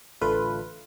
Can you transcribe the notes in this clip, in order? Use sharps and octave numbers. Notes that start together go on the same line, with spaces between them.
A1 D3 A3 F4 B4